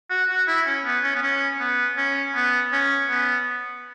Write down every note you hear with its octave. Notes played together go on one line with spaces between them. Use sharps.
F#4
F#4
E4
C#4
B3
C#4
B3
C#4
B3
C#4
B3
C#4
B3